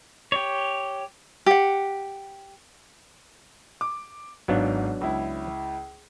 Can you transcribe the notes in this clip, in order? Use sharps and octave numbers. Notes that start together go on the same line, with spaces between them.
G4 C#5
G4 F#5
D6
G#1 G#2 F#3 B3 D4 F5
C#2 E4